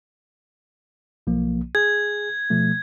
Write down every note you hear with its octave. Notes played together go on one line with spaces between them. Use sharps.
B1 F3 A#3
G#4 G#6
B2 F3 A3